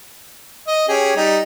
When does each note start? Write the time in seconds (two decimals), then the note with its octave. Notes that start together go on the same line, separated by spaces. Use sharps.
0.67 D#5
0.89 C#4 G4 G#4
1.16 G3 D#4